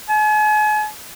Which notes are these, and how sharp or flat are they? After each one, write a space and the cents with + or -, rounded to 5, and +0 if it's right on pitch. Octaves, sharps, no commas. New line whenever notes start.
G#5 +40